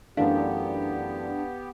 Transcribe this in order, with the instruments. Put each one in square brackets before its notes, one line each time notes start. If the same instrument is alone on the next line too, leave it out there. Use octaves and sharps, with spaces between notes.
[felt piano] F#2 E3 A3 [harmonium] B3 G4 [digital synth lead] D4 [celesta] F5